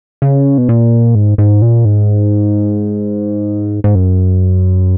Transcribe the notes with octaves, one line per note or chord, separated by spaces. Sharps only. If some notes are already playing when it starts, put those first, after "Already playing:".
C#3
B2
A#2
G#2
G#2
A#2
G#2
G#2
F#2